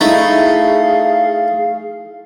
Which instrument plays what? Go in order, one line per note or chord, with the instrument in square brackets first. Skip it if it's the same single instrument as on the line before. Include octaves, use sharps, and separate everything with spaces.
[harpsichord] A3 [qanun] D#4 E4 D#5 [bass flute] G#4 [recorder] F5